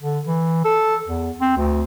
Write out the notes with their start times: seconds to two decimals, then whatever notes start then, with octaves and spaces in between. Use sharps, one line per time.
0.03 D3
0.27 E3
0.65 A4
1.08 E2
1.41 C4
1.57 D2